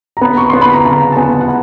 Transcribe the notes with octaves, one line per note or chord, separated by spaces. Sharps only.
A#5
B3 B5
C#6
B3 C6
B5
A#5
C#3 A5
A5
B3 G#5
F#5